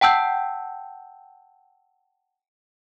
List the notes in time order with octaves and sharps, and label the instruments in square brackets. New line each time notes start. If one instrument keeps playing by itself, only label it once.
[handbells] F#5 G5 A5 E6 G6